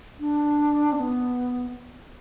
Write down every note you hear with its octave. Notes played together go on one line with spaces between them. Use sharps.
D4
C4
B3